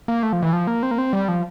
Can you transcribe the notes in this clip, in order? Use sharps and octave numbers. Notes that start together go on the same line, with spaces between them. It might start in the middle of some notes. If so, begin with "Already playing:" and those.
A#3
A3
F3
E3
F3
A#3
C4
A#3
C4
G3
F3